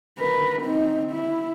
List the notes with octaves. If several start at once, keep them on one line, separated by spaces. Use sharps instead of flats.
A#4 B4
C4 D#4
E4